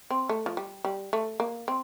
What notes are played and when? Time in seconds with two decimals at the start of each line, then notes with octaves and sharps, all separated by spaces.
0.10 C4
0.29 A3
0.46 F3
0.57 G3
0.85 G3
1.13 A3
1.40 A#3
1.68 C4